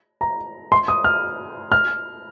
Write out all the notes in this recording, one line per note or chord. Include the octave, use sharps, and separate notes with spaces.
A#5
C6
D#6
F6
F6